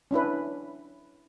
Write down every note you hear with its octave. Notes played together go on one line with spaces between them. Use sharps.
C#4 D4 E4 B4